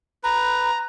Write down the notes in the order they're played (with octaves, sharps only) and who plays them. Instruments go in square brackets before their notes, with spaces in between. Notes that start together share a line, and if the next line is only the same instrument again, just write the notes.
[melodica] B4 [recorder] A#5